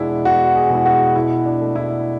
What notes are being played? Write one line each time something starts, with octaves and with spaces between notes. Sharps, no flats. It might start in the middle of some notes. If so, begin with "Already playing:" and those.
Already playing: E2 B2 G#3 D4 E4
E2 F#4
G#4
B2 G#3 E4
F#4
B2 E4
D4
A3
E4